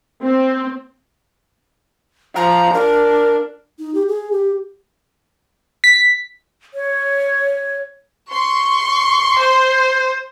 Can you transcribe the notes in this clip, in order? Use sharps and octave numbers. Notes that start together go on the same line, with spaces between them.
C4
F3 A#5
D4 A#4
D#4
G4
G#4
G4
B6
C#5
C6 C#6
C5